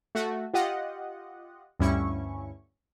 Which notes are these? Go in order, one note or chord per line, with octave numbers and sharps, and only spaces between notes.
A3 F#4
F4 G4 D#5 F#5
D2 G2 C#4 E4 C#6